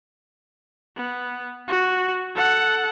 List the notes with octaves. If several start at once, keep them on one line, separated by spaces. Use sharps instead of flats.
B3
F#4
A4 F#5